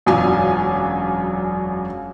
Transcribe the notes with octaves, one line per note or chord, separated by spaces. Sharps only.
E1 F#2 F#3 D4 F4 G#5